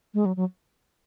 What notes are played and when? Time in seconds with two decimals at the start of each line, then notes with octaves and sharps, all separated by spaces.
0.14 G#3
0.26 F#3
0.36 F#3